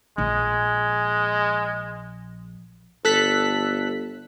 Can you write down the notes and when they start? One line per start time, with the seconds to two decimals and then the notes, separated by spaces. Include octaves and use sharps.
0.18 A#1 G#3
3.05 G1 A4 F#6 B6